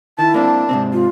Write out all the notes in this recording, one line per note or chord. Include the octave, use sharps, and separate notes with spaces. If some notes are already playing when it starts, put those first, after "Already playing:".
D#3 E4 A5
A#3 C4 D4
G#2 C3 C4
F4